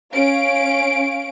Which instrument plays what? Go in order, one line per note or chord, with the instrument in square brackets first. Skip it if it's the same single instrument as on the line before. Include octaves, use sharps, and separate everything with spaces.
[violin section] C#4 F5 D7